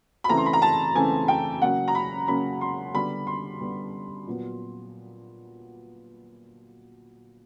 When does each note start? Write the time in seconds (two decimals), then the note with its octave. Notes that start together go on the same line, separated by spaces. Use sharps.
0.24 B5
0.28 C#3 E3 A3 C4 A#5
0.37 C6
0.46 B5
0.53 A#5
0.62 A5
0.95 C#3 E3 A3 C4 G#5
1.28 G5
1.61 C#3 F#3 A#3 C#4 F#5
1.88 A#5
1.95 B5
2.28 C#3 F#3 A#3 C#4 B5
2.61 C6
2.94 D3 G3 B3 B5
3.27 C6
3.60 D3 G3 B3
4.27 A#2 F#3 B3